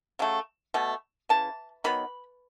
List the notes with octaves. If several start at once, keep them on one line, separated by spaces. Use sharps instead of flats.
C#3 F#3 A3
B2 A3
C#3 E3 A5
D#3 F#3 B3 B5